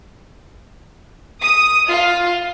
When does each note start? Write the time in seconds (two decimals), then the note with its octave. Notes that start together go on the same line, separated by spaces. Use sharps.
1.42 D#6
1.89 F4